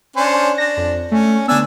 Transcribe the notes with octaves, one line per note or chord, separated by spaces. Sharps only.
C#4 D4 C5
D4 A#6
F2
A3 C#4
D3 B3 D4 G#5 E6